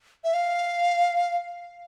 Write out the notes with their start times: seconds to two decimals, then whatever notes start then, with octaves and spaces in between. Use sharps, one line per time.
0.24 E5
0.34 F5